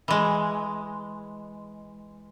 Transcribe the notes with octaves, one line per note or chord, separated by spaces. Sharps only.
E3 G#3